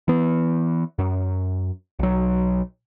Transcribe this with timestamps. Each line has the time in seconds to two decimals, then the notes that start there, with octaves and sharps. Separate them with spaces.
0.08 E3 B3
0.99 F#2
1.99 B1 F#3